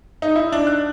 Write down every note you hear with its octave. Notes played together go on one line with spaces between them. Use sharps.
D#4
E4
D4
F#6